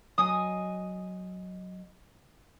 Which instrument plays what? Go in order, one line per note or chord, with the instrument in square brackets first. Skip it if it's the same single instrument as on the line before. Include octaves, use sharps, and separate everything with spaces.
[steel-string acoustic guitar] F#3 D#5 G#5 [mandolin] D#6